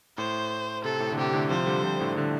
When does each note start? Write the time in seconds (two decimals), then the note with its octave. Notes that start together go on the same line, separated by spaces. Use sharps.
0.17 A2 C5
0.84 C3 A4
1.00 A2
1.13 D3
1.18 C3 G4
1.33 A2 D3
1.50 C3 F3 C5
1.67 D3 G3
1.83 C3 F3
2.00 A2 D3
2.16 A2 D3